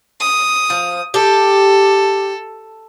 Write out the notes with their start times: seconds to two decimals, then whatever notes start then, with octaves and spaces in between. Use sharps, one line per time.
0.20 D#6
0.70 F3
1.14 G4 A4